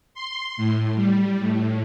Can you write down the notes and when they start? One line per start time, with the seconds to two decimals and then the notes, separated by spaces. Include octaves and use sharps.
0.14 C6
0.57 A2
0.96 G3
1.40 A2